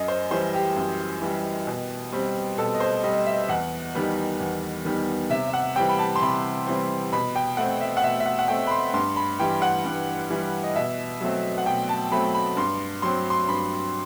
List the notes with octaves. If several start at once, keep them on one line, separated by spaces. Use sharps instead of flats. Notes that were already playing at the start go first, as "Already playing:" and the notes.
Already playing: F#2 D#5
C5
E3 G3 C5
G4
F#2
E3 G3
B2
G3 C4
B2 A4
D#5
C5
G3 C4 D#5
E5
E2 F#5
D#3 G3 B3
E2
D#3 G3 B3
C3 E5
E5
F#5
E3 G3 C4 G5
B5
A5
C6
C3 B5
E3 G3 C4
B2 B5
G5
A3 C4 F#5
E5
F#5
B2 E5
E5
F#5
F#5
A3 C4 G5
B5
C6
G2 C6
B5
E3 G3 G5
F#5
G2
E3 G3
D#5
B2 E5
F#3 A3 C4
F#5
B2 G5
A5
F#3 A3 C4 B5
B5
G2 C6
F#3 C4 C6
C6
G2 B5